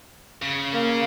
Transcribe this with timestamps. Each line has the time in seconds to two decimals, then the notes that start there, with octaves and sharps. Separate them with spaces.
0.42 C#3
0.73 A#3